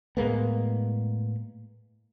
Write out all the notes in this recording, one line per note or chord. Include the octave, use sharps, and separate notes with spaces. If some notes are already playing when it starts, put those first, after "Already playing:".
A2 G#3 A#3 B3